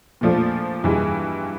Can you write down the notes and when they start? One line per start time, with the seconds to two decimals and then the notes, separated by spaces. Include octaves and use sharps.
0.21 A#2 F3 A3 D4 F4
0.84 G2 E3 G#3